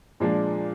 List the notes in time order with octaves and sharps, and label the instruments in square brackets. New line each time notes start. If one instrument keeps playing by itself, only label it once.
[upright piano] A#2 F3 G#3 D4